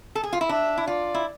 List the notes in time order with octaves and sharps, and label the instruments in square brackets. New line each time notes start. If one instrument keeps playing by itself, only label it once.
[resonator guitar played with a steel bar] A4
G#4
F4
E4
[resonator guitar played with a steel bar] D4 [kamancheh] E5
[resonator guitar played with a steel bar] E4
[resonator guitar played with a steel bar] F4 [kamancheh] D5
[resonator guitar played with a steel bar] E4